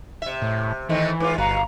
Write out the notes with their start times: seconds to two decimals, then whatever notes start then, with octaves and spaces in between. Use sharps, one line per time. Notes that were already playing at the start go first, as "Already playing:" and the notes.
0.22 C3 E5
0.42 A2
0.89 D#3 E3 A3 C4 D#5
1.20 G#2 F4 B4 D6
1.38 G1 G3 F#4 B4 F5 A#5